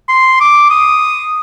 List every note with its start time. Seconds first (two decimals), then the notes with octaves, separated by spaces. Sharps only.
0.09 C6
0.41 D6
0.70 D#6